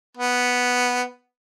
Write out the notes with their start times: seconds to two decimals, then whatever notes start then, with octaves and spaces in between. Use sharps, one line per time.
0.17 B3